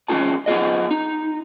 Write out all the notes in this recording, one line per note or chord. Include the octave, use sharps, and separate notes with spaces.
E2 G#3 C#4 F4 G#4 A5
B3 F4 G#4 D#5
D#4